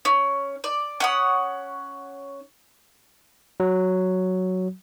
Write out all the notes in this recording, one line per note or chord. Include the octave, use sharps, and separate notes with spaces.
C#4
D5
C#4 F#5 D#6
F#3